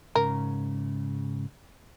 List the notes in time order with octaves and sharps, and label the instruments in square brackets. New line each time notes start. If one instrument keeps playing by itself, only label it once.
[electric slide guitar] G#2 C#3 [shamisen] A#4